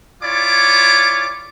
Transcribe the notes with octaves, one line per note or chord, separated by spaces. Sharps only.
E4 F4 C#5 D5 G#5 D6